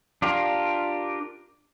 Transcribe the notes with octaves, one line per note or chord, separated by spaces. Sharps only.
D4 F4 G4 A#4